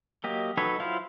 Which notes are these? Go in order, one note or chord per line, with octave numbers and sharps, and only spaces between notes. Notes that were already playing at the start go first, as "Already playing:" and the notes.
F#3 A#3 G4 D#5
F#3 D#4 A4 B4 C#5
F#3 E4 F4 C5 F5